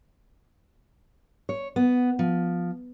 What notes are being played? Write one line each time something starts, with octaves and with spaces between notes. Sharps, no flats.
C#5
B3
F3